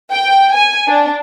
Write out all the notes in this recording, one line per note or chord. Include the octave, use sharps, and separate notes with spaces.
G5
G#5
D4